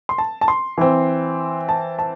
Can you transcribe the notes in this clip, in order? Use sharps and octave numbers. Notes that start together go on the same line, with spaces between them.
C6
A5
A5
C6
E3 C4
A5
A5